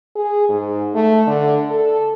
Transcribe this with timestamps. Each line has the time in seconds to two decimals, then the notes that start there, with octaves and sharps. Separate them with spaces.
0.16 G#4
0.49 G#2
0.94 A3
1.27 D3
1.71 A4